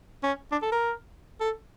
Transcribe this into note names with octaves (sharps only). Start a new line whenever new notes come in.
C#4
D4
A4
A#4
A4